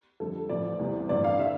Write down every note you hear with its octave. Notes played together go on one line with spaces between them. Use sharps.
F2 D3 G3 A4
A1 A2 F3 D5
E2 C3 E3 G3
A1 G2 D3 D5
F5
D3 E5